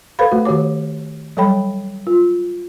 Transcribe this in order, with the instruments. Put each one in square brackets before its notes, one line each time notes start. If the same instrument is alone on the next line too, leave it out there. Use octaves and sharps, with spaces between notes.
[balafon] A4 B4 C5 F5 B5
A3 F#4
D#3 F#4 G4 C#5 D6
F#3 G3 A4 C#5 G5 B5
F4